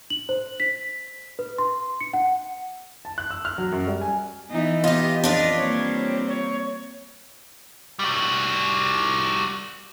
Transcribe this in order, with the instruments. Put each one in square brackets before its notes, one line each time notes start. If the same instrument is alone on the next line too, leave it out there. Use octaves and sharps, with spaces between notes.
[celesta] F#7
C5
B6
B4
C6
C#7
F#5
[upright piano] A5
F#6
E6
F6
F#3
F#2
G3
G#5
[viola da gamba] E3 B3 D#4
[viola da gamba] B3 [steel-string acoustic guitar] F4 G4 [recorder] D#5
[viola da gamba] F2 [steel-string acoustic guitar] D4 F4 B4 [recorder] D#5
[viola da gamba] G3 A#3 C4 [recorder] C#5
[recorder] C#5
[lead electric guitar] G3 F#4